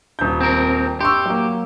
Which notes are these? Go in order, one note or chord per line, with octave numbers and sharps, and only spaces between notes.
D#1 G6
C4 A#4
G4 C6 C#6 E6
F#3 A#3